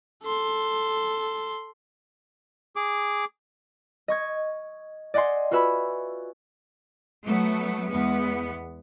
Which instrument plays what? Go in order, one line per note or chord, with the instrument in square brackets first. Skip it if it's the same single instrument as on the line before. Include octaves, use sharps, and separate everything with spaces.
[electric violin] A4 C6
[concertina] G#4 D6
[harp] D#5 C#6 G#6
D5 D#5 F#5 G#5 C6
F4 F#4 B4 E5 G#5 B5
[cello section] F#3 A3 B3
E2 G#3 B3